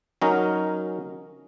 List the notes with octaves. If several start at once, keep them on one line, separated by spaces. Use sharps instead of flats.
F#3 C#4 D#4 A#4